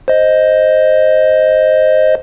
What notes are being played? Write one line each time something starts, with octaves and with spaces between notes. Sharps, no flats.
C5 D#5